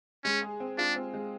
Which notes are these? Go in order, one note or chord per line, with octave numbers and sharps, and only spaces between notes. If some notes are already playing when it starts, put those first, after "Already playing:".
G#3 C#4
G#4
C4
D4 F4
C4
G#3